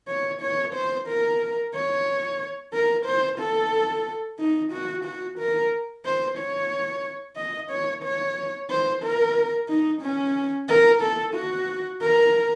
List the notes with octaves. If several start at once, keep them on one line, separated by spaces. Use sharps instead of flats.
C#5
C#5
C5
A#4
C#5
A#4
C5
A4
D#4
F#4
F#4
A#4
C5
C#5
D#5
C#5
C#5
C5
A#4
D#4
C#4
A#4
A4
F#4
A#4